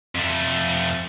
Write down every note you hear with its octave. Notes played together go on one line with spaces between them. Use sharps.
F2 A3